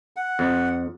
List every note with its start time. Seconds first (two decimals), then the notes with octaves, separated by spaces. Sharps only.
0.16 F#5
0.39 F2